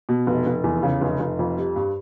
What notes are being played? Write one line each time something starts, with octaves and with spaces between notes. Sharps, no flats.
B2
F1
F1
E2
C#3
F1
F1
F2
G3
G2